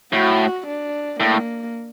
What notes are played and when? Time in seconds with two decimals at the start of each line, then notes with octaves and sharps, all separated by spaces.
0.13 A2 F#4
0.66 D4
1.20 A2 A#3